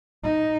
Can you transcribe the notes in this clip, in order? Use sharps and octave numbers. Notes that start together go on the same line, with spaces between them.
D#4